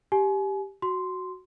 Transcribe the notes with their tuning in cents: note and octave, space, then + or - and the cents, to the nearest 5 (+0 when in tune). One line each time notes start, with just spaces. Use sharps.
G4 +0 G#5 +30
F#4 +0 C6 -5